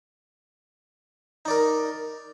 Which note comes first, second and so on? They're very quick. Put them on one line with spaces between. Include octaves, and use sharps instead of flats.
D#4 D5 A#4